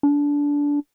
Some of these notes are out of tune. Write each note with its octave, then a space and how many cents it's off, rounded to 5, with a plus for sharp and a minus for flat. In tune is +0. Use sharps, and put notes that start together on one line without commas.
D4 -20